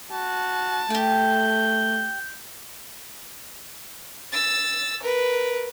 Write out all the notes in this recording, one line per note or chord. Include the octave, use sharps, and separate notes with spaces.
F#4 A5
A3 G4 G5 G6
E6 A6
A#4 B4